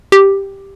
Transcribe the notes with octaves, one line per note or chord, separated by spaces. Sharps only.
G4